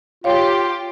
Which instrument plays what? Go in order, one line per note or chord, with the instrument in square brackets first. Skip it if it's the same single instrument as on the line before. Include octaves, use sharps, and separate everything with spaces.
[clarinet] F4 [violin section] G4 [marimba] C#5 F5